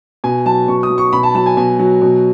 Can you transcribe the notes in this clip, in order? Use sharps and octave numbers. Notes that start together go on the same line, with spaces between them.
B2 G#5
F#3 A5
B2 C#6
D#6
F#3
C#6
B2 B5
A5
F#3 A5
G#5
B2 G#5
F#3
B2